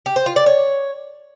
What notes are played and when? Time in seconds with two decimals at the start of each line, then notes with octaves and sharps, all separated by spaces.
0.06 G4
0.16 C5
0.26 F4
0.36 D5
0.46 C#5